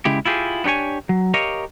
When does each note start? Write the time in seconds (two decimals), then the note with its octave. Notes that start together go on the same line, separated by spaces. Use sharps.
0.05 C#3 G#3 E4 G4
0.25 E4 F4 G4 G#4
0.64 B3 D4 G4 C#5 G#5
1.09 F#3
1.34 G4 A#4 C#5 D#5 F5